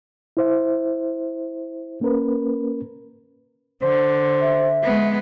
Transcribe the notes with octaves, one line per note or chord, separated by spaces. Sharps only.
E4 C5 E5
A#3 C#4 A#4 B4
D3 C5
E5
G#3 B3